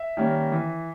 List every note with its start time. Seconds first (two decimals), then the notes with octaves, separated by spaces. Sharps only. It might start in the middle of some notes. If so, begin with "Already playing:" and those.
Already playing: E5
0.17 D#3 G3 A#3 C#4
0.52 E3